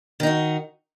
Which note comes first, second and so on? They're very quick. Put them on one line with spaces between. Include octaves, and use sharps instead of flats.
D#3 D#4 F#4